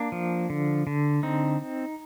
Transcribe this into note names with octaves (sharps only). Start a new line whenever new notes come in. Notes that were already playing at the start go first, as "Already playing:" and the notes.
Already playing: A#3 D4
F3
D3
D3
C4 D#4